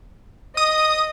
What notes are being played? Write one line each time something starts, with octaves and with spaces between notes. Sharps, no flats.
D#5 D#6